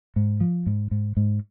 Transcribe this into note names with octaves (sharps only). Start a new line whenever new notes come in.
G#2
F3
G#2
G#2
G#2